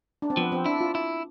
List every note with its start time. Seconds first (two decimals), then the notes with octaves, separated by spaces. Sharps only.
0.22 D4
0.30 C4
0.37 F3 B3
0.52 C4
0.65 D4 E4
0.81 F4
0.95 E4